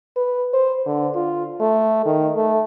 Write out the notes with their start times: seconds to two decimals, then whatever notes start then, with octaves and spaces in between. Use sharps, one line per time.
0.16 B4
0.54 C5
0.86 D3
1.15 F4
1.60 A3
2.05 D#3
2.35 A3